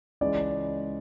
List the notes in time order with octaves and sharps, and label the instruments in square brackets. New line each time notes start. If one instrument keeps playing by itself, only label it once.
[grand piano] C#2 C#3 E3 G#3 D5